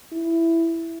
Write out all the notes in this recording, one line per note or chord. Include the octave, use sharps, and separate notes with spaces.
E4